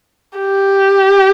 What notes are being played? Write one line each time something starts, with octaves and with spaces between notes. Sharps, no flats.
G4